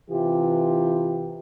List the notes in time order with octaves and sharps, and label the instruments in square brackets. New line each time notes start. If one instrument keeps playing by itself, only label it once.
[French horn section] C3 E3 F4 G4